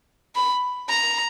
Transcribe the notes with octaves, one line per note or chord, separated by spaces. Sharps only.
B5
A#5